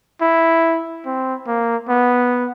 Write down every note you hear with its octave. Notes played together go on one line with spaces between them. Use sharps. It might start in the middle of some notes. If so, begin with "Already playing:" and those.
E4
C4
A#3
B3